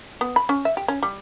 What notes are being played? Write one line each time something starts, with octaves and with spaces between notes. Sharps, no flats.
B3
B5
C#4
E5
G4
C#4
G3